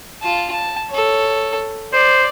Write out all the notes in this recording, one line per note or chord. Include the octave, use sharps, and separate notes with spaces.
F4 A5
A5
A4 C#5
C5 D5